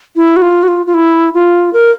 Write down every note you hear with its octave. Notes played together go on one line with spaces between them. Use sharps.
E4
F#4
F4
F#4
F4
F4
E4
F4
A#4